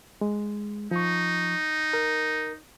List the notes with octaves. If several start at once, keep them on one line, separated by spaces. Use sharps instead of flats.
G#3
F3 D#4 C#6
A#4